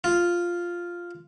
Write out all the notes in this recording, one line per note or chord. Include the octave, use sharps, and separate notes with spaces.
F4